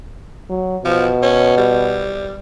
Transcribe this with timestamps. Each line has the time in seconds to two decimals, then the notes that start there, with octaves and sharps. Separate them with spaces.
0.50 F#3
0.85 B2 F3
1.23 C#4
1.57 G3